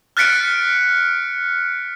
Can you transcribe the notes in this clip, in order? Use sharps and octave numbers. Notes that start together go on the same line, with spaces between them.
F6 F#6 A6 B6 C#7 D7